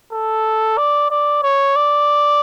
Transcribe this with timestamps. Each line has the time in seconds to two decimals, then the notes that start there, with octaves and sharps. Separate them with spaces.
0.12 A4
0.78 D5
1.11 D5
1.43 C#5
1.76 D5